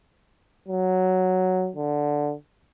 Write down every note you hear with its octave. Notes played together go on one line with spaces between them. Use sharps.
F#3
D3